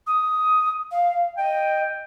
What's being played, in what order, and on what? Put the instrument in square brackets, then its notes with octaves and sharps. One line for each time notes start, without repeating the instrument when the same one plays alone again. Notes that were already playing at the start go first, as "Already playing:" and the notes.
[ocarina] D#6
F5
[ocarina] D#5 [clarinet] G5